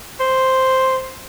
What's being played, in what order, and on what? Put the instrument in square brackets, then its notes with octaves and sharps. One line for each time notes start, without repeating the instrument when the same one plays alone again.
[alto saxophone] C5